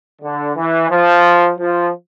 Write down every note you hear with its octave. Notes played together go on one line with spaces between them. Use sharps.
D3
E3
F3
F3